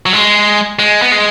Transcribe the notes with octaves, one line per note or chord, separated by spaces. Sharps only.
F#3
G#3
G#3
B3
G#3